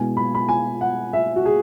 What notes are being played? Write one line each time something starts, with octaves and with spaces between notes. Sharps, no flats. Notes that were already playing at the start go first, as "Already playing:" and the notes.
Already playing: B2 G#3 E4 G#5
B5
B5
G#5
F#5
E5
F#4
G#4